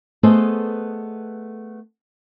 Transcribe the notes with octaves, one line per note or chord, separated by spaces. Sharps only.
A3 B3 G#4 A4 C5 D#5